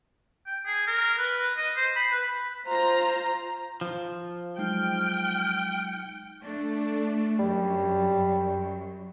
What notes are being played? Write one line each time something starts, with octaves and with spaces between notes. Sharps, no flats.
G5
G#4
A#4
B4
D#5
C5
B5
B4
B5
F4 C5 A#5
F3
F#3 G#3 D#4 G5 F6
A3 D4
F#2 G3
F#2